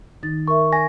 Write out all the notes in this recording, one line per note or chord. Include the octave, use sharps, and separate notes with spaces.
D#3 D#4 A6
A#4 E5 C#6
G#5 A#6